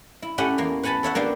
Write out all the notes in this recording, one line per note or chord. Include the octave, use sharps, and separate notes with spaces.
E4
A3 C#4 E4 G4 F#5 G#5
E2 A#3
B4 F#5 G#5 A5 B5
A4 C#5 E5 F#5
A#3 B3 D4 G4